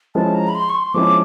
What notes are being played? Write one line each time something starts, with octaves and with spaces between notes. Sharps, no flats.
F3 G#3 C#4 E4 A5
A#5
B5
C6
C#6
C6
F3 G#3 C#4 E4 D6